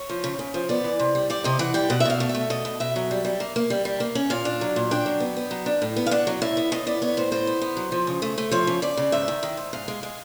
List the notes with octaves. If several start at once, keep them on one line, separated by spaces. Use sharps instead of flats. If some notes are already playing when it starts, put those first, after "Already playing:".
Already playing: C#5
F3
C#3
C#3
F3
B3 D5
E3
C3
G3
G3 D5
C3 D#5
E3 F#5
G3 G5
B2 F#5
E5
B2 F5
A3
E5
A3
B2 D#5
B2
B2 E5
F#3
G3
G3
A#3
A#3
G3
G3
A#3
C#4
A#2 F5
D4
F#3
A#2
D4 G5
F#3
B3
B3
F#3
D4
A2
B3
F5
D4 F#5
F#3
A2 E5
B3
A2 D#5
B3 D5
B3 C#5
A2 C5
A2 C5
B3
B3
F#3
F3
C#3
A3
A3
F3 C#5
C#3
C#3 D5
C#3
G#2 E5
D#3
D#3
G#2
G#2 F5
G#3
G#3